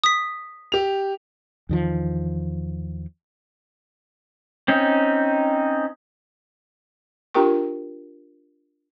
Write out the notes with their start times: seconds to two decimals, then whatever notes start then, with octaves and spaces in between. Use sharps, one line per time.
0.04 D#6 B6
0.72 G4 F7
1.69 E2 D#3 F3
4.68 C4 C#4 D#4
7.34 D4 F4 G4 A#4 G5 C#6